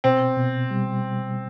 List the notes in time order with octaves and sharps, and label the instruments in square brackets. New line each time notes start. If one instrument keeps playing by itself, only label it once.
[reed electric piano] B2 [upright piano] C4
[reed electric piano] B2
G3